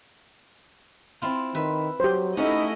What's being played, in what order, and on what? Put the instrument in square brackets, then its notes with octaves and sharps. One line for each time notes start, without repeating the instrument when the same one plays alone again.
[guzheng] C4 E4 F4
[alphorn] D#3 [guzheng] B4 E5
[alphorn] F#3 [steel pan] G4 C5
[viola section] A3 E4 D#5 [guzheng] C#4 F#4 G#4 [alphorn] D#4